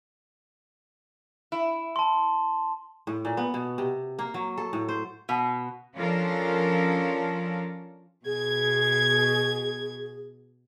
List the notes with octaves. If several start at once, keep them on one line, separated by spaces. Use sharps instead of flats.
E4
A5 C6
A2
A#2
B3
B2
C3
A#3
F#3
A4
A2
C5
B2
F3 C#4 D4 F4 A4 A#4
B2 G#4 G#6